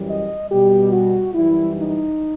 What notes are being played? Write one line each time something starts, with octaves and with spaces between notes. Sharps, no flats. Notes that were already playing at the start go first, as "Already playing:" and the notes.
Already playing: F#2 E3 G3
D#5
B2 G3 G4
F#4
F#2 E3 G3 E4
D#4